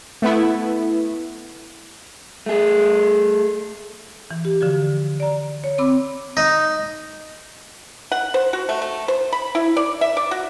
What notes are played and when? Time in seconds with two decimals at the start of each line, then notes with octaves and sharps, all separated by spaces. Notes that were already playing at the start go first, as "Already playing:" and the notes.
0.22 A3 B3 E4
2.46 A3 G#4
4.31 E3
4.45 G4
4.61 D3 F3 F#4
5.20 D5 A#5
5.64 C#5
5.78 C4 B5 D6 E6
6.37 D#4
8.12 F#5
8.34 C5
8.53 F#4
8.69 A3
8.82 A3
9.08 C5
9.33 B5
9.55 E4
9.77 D5
10.01 E5
10.17 D5
10.31 F#4